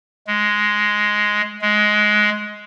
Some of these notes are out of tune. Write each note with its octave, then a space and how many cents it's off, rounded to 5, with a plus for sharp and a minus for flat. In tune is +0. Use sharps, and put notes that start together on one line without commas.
G#3 +5
G#3 +15